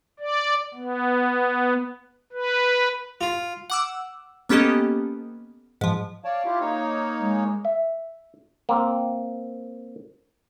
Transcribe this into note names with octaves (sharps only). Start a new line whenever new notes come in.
D5
B3
B4
F4
F#5 D6 E6
A#3 B3 C#4 G4 A4 D#5
G#2 F3
C#5 D5 F5 A5
E4 F4 G4
A#3 D#4 C#5
G#3
E5
A#3 C4